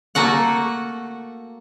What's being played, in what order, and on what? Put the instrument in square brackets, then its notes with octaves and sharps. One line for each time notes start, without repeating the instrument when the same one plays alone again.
[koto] A3 A#3 F#4 F#5